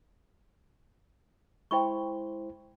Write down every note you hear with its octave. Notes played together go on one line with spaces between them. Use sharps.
G#3 E4 C5 G5 B5 C#6